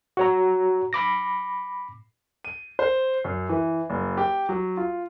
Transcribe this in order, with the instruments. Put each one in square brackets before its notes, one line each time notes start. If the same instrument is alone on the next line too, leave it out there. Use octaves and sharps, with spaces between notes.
[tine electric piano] F#4 C#5 A#5
B5 D6 A#6
[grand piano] D#7
C5
F#2
E3
F#1
G4
F#3
F4